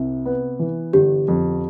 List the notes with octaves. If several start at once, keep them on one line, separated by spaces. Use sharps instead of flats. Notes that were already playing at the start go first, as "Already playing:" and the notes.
Already playing: C2 C3
B3
E3
G1 G4
F2